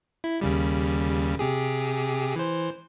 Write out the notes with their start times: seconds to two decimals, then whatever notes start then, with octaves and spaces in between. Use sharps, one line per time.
0.24 E4
0.41 D#2 C#3 G3
1.39 C3 G4 G#4
2.36 E3 C5